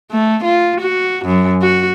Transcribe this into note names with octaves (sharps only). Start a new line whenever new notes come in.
A3
F4
F#4
F#2
F#4